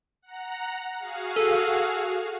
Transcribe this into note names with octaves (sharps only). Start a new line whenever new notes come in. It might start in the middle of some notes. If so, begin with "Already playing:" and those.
F#5 A#5
F#4 G#4 F5
A4